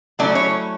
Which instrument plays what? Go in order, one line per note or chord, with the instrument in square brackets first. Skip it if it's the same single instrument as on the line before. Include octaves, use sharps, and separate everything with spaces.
[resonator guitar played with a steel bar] F#3 A3 C#4 E4 D5
C#5